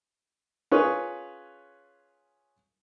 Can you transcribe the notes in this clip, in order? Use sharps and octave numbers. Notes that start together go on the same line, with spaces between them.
C#4 F4 G#4 B4 C#5